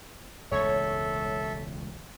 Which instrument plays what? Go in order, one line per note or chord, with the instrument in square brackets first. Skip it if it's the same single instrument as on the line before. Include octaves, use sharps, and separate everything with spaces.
[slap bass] E1 C#2 A2 [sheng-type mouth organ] A4 E5 [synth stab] C#5